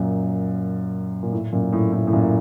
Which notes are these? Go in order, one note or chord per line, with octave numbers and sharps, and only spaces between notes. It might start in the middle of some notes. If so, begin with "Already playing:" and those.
Already playing: F#2 A#2
A#2
A2
F#2 A#2
A2
A2
A2
F#2 A#2